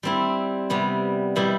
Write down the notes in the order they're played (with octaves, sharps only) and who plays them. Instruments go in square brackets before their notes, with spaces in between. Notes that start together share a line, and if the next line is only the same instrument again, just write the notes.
[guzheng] G3 C4 E4
C3 G3 B3
B2 G3 B3 E4 G4